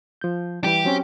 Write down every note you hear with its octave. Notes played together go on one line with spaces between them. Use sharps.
F3 G6
E3 G3 G4
F#3 C4 C#4